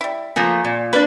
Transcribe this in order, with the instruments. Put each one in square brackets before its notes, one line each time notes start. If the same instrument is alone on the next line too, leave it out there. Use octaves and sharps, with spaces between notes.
[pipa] G3 E4
[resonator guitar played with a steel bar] F3 A3 A#3 [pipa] G#4
[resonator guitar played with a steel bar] A#2
[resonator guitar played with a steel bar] A#3 D4 [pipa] B4